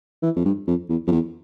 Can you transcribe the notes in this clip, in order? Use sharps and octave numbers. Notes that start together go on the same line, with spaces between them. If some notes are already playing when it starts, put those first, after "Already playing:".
E3
F2
G2
F2
E2
F2
E2